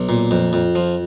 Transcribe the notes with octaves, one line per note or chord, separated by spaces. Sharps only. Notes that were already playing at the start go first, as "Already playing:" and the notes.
Already playing: B1
A#2
F2
F2
F3